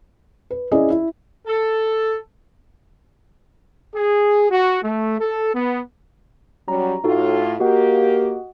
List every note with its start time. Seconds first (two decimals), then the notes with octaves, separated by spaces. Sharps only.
0.50 B4
0.72 C#4 E4 G#4 D5 D#5
0.90 E4
1.46 A4
3.94 G#4
4.50 F#4
4.83 A3
5.19 A4
5.54 B3
6.68 F#3 G3 C#4 A#5
7.04 A2 D#4 F4 F#4 A4
7.60 A#3 F#4 G4 D#5 F#5